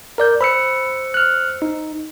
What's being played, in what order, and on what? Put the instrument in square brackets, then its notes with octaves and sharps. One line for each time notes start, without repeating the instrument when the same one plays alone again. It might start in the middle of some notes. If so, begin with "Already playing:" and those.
[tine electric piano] A#4 D5 G6
[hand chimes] C5 E6 C#7 [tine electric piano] B5
[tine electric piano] F6 F#6
D#4